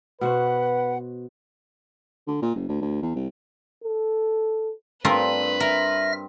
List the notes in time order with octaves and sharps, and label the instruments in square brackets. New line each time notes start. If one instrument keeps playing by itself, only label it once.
[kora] B2 F#4 C5 [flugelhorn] B4 [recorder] F#5
[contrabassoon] D3
A#2
F#1
D2
D2
E2
C2
[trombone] A4
[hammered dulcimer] G2 C4 [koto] A3 F4 A#4 [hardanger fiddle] B4
[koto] A#4 [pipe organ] E5 F6 A#6